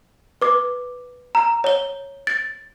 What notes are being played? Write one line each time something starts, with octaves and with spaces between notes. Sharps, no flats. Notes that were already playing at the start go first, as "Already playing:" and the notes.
B4 D6
A#5
C#5 G7
A6